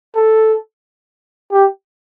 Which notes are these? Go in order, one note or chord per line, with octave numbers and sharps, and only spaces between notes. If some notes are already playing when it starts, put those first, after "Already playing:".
A4
G4